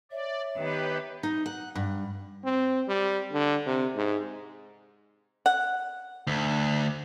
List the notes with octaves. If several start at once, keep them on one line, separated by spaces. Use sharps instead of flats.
C#5 D5 E5
D#3 B3 G4 B4
D#4
F#5
G2
C4
G3
D3
C3
G#2
F#5
D2